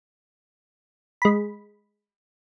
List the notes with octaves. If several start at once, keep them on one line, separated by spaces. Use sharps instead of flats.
G#3 B5